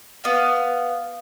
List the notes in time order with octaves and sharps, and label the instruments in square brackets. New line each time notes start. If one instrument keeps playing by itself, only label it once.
[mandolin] B3 F5